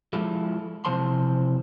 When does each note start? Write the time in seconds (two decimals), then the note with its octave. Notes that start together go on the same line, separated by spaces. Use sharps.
0.13 F3 G#3 E4 F4 A4
0.85 C3 E3 F3 C5 A5 C6